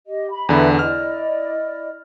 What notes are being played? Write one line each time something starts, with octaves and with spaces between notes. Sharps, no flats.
G4 D#5
B5
E2 D3 B4 E5 B5
E4 D5 D#5 F6